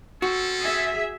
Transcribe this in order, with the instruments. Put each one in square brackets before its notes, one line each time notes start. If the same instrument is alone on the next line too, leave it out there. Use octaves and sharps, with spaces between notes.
[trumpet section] C4 C#4 A4 [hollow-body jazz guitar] F#4
[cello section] G#4 E5